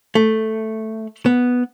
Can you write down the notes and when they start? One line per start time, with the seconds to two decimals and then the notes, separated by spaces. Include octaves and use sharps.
0.15 A3
1.26 B3